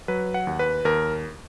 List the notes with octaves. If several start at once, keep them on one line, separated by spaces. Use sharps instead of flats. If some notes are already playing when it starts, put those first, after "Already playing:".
F#3 B4
F#5
D#2
B4
D#2 A#4